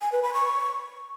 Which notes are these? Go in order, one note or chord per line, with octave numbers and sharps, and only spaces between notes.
G#5
B4
B5
C#6